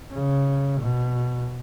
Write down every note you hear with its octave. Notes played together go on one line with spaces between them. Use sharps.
C#3
B2